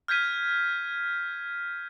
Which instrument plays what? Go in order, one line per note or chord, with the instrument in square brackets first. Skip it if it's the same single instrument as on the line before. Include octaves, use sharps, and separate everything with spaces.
[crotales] F6 G6 G#6 B6 D#7